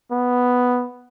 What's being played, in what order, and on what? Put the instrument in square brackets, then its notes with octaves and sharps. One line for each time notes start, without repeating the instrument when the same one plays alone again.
[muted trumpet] B3